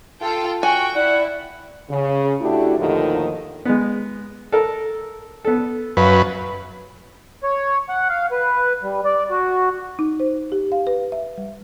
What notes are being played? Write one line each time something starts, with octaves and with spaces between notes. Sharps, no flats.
F4 A4 G5
F#4 G5 G#5 C#6
E4 D5 F#5
C#3
A3 D4 E4 F#4 G4
D#2 A2 D3 D#3 F3
G#3 B3
A4 A#4
B3 A4
F#2 B4 F5
C#5
F#5
F5
B4
G3
D5
F#4
D#4
C5
G4
F5
B4
E5
G3